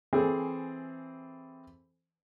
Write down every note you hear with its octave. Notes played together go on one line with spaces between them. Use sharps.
E3 C4 G#4 A4